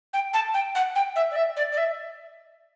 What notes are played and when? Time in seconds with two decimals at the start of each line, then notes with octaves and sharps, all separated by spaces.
0.13 G5
0.33 A5
0.54 G5
0.75 F#5
0.95 G5
1.16 E5
1.31 D5
1.36 E5
1.56 D5
1.72 D5
1.77 E5